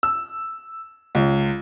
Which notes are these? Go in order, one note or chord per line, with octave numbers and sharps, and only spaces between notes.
E6
C#2